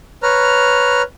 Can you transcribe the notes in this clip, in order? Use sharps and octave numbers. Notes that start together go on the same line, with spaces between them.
B4 C#5 A#5 F6